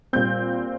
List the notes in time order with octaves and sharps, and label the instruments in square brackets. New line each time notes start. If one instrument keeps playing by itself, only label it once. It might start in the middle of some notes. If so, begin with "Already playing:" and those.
[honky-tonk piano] A#2 G3 C4 G6